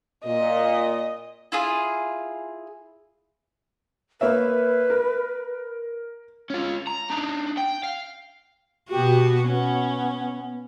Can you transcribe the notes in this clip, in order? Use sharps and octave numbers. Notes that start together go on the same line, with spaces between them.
A#2 D#5
E4 F4 G#4
A#3 B4 C#5 E5
A#4
C#4 F4
A#5
D4 D#4
G5
F5
B2 B3 F#4 G4
B3 C#4